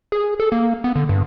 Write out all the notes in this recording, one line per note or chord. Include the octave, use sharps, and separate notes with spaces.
G#4
A4
A#3
B3
D3
G2